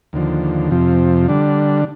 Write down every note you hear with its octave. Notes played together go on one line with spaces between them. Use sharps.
D#2 D3 F3
F2 C3 F3
D3 G3 D4